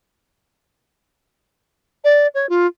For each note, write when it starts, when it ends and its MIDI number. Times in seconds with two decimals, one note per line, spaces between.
2.04 2.27 74
2.35 2.49 73
2.49 2.67 65